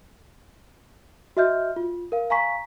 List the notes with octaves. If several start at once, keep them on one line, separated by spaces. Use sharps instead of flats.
F#4 D#5 E5 F6 G6
F4
A#4 F5
F5 G#5 A#5 C#6 B6